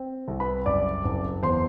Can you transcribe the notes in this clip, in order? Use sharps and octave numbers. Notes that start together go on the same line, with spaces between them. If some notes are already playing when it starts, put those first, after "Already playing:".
Already playing: C4
C2
B4 B5
F#1 D5 D6
F#1
E2 C5 C6